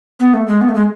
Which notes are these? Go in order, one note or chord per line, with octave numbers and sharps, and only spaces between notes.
B3
A3
G#3
B3
A3
G#3